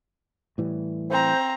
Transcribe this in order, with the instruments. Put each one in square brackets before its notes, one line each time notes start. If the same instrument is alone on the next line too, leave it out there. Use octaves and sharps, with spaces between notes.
[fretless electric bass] A2 E3 G3
[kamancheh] C4 A#5 [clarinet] C5